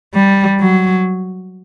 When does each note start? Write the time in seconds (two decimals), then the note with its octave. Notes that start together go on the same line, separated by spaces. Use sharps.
0.14 G3
0.60 F#3